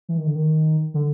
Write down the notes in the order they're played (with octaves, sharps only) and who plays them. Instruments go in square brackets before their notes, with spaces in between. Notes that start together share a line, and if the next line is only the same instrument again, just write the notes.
[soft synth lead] E3
D#3
D3
D#3
D3